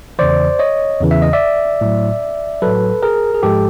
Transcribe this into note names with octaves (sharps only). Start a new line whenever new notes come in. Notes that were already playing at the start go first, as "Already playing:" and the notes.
E2 C#3 E3 C5 D5
C#5 D#5
E2 C#3 E3
E5
D#5
D5 E5
A2 F#3
A2 F#3 A4 B4
G#4 A#4
G#4
G#2 F3 G#3 G4 A4